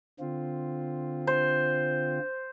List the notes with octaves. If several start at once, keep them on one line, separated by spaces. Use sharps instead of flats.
D3 C4 F4
C5